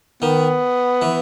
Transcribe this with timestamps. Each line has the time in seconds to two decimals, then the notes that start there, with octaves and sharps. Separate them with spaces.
0.22 D#3 B3
1.02 E3